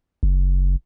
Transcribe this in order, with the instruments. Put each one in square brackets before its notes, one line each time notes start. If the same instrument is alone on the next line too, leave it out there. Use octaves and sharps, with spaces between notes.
[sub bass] F#1